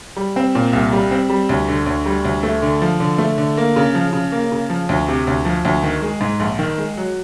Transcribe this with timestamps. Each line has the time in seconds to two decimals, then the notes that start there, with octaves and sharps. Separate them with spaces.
0.16 G3
0.36 C4
0.55 A#2
0.73 C2
0.93 G3
1.11 C4
1.30 G3
1.49 D2
1.68 D3
1.86 D2
2.06 G3
2.25 D2
2.43 A3
2.62 D3
2.82 F3
3.00 D3
3.18 A3
3.38 D3
3.57 A#3
3.76 C#3
3.95 F3
4.13 C#3
4.32 A#3
4.52 C#3
4.70 F3
4.89 D2
5.08 C3
5.27 D2
5.45 F3
5.65 D2
5.83 D#3
6.02 G#3
6.21 G#2
6.40 A#1
6.59 D#3
6.78 G#3
6.97 F#3